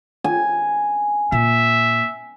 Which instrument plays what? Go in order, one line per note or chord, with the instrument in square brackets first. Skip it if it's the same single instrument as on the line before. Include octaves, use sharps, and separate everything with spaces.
[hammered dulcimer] G#5
[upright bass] A#2 [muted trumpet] E5